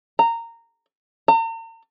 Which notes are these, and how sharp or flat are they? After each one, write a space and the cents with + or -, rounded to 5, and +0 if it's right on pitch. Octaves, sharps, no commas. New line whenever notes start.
A#5 -15
A#5 -45